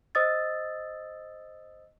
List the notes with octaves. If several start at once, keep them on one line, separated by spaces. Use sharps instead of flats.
C5 D#5 D#6 E6 A6